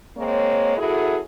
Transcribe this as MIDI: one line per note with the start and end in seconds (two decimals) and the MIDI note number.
0.17 0.75 56
0.17 0.75 58
0.17 0.75 60
0.17 0.75 73
0.78 1.19 42
0.78 1.19 64
0.78 1.19 66
0.78 1.19 68
0.78 1.19 69